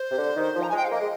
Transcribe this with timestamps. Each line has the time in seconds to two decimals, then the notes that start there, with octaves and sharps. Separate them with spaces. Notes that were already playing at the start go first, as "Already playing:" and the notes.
Already playing: C5
0.11 C3
0.18 D3
0.36 D#3
0.55 F3
0.62 A#5
0.69 G#5
0.73 G#3 G5
0.85 F5
0.91 A#3 D#5
1.00 G#3